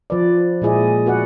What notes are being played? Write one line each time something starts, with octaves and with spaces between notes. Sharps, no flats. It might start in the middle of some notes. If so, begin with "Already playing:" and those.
F3 B4 D5
A#2 G#3 E4 G#4 D5 D#5
B3 F#4 B4 D5 D#5 F#5